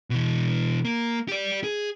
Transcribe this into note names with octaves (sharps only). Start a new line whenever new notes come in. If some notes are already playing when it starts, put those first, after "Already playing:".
B2 E3
A#3
G4 D5
G#4